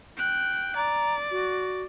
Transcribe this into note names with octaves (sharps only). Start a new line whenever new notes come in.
G5 F#6
D5 A#5
F#4